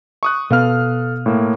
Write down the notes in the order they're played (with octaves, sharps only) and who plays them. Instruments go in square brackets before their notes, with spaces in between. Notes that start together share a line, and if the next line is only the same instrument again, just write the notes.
[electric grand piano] C#6 D#6 F#6
[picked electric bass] B2 B3 [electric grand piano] A4 F5 F6
[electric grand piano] A2 A#3